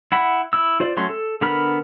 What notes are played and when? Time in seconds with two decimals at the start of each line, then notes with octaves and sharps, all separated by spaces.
0.12 E4 F#5 B5
0.53 E4 E6
0.80 F4 C5 D5
0.97 F#3 A3 C#4 C6
1.09 A4
1.41 D3 B3 A#4 B5 F6